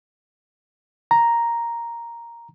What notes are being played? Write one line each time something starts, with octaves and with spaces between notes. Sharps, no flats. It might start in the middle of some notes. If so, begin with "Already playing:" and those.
A#5